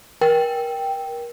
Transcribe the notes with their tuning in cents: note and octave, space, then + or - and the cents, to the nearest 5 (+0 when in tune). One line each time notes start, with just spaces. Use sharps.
A#4 +30 G5 +0